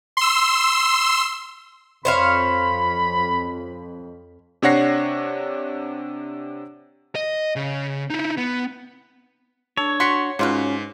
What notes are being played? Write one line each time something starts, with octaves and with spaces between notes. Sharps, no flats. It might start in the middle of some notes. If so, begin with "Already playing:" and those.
C6 E6
F2 C5 C#5 F5 B5
C3 D4 C#5 F#5 A#6 C7
D#5
C#3
D#4 E4
B3
D4 A4 C#5
F#4 C6 B6 C#7
G#2 F#3 C#4 F4 B4